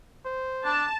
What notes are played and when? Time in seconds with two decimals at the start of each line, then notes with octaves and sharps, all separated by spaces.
0.25 C5
0.65 D4 A5